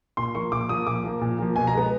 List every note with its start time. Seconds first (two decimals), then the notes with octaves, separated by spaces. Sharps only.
0.17 A#2 C6
0.35 F3 A#3 C#6
0.52 A#2 D6
0.69 F3 A#3 D#6
0.87 A#2 D6
1.04 F3 A#3
1.21 A#2
1.38 F3 A#3
1.56 B2 G#5
1.67 A#5
1.73 G#3 B3